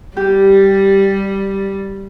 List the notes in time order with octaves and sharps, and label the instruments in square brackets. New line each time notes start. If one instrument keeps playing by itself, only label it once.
[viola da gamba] G3 [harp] G4